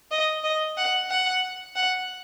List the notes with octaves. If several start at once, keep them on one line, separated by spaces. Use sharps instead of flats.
D#5
D#5
F#5
F#5
F#5